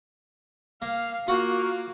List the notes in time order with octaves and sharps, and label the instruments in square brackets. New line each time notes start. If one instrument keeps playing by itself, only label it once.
[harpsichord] A#3 [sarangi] F5
[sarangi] A#3 [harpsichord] F4 F#5 C#6 [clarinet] F#4